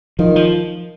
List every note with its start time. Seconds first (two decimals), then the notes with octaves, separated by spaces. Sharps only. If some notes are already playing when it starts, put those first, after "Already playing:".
0.19 D#3 F3
0.36 F3